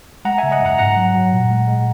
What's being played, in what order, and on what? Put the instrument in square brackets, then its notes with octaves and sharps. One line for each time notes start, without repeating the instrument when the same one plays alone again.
[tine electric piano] G#3 F#5 A#5
E5 G#5
C#3
D#5 F#5
F#2 F#5 A#5
G#2 F#5 A#5
F#3
F#3
A#2
G#3
G#3